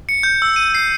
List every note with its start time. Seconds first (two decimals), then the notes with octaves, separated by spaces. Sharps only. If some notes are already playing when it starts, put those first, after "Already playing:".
0.09 C#7
0.23 G6
0.42 E6
0.56 D#7
0.75 C7